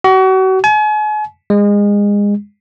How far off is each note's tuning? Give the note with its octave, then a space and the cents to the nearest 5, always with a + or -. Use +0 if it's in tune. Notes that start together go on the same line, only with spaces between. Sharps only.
F#4 +35
G#5 +40
G#3 -25